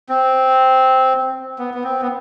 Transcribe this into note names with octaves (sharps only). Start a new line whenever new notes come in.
C4
B3
B3
C4
B3